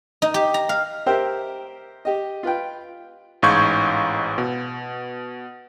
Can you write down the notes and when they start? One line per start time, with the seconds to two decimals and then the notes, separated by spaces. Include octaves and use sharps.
0.22 D#4
0.34 G4
0.54 A#5
0.69 F5
1.06 G4 A#4 C5 E5 G5
2.05 G4 D#5
2.43 F4 B4 G5
3.42 A1 G#2 F5 C#6 G6 G#6
4.38 B2